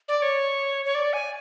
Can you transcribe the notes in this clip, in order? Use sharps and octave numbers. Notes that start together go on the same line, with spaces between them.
D5
C#5
C#5
D5
G#5